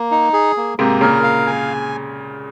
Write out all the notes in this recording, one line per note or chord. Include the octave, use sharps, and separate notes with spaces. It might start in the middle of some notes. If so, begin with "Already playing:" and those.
Already playing: A#3
D#4
G#4
A#3
G#2 C3 A#3
A#2 C#3 A#4
F5
G#5